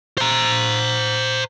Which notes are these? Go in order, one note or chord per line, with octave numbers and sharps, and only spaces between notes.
C5 A#5